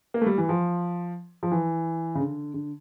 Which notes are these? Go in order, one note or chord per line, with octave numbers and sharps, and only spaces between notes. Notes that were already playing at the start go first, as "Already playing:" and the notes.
A#3
A3
G3
E3
F3
F3
E3
C#3
D3
D3